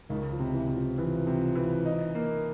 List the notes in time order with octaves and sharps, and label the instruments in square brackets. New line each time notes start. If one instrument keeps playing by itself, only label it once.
[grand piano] C#2 [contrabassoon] D#3
[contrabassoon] F3
[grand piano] C3
[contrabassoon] E3
[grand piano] C3
[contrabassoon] F3
[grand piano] E3
C3
E3
D#4
A#3